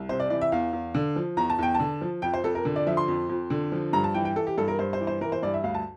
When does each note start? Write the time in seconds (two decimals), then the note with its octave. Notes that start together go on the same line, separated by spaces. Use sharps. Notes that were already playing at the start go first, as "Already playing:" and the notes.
Already playing: C2
0.09 C3 C5
0.20 D5
0.30 E3 D5
0.41 E5
0.52 E2 F5
0.73 E2
0.95 D3
1.16 F3
1.37 E2 A#5
1.50 A5
1.59 E2 G5
1.75 A5
1.80 D3
2.01 F3
2.22 F2 G5
2.34 C5
2.44 F2 A4
2.55 A#4
2.65 D3
2.76 D5
2.87 F3 E5
2.97 C6
3.08 F2
3.29 F2
3.50 D3
3.72 F3
3.93 G2 A#5
4.04 A5
4.14 E3 G5
4.25 G5
4.36 E3 A4
4.47 G4
4.57 G2 A4
4.68 A#4
4.79 G2 C5
4.93 C5
5.01 E3
5.07 C5
5.21 E3 A#4
5.32 C5
5.43 G2 D5
5.54 E5
5.64 D2 F5
5.74 A5